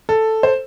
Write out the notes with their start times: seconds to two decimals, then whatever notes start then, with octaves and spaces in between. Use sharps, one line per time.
0.09 A4
0.43 C5